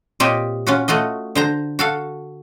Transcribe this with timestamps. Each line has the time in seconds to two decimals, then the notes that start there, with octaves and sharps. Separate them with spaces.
0.20 A#2 C4 F4 G4 C#5 D#5
0.67 C#4 F4 F#4
0.88 A3 F4 F#4 D#5
1.35 D3 C5 A#5
1.79 F#4 A4 F5